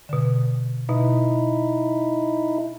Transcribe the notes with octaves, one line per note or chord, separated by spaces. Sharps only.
B2 D3
B2 D#4 E4